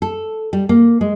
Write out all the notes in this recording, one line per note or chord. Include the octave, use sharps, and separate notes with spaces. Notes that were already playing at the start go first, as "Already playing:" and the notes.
A4
G3
A#3
G#3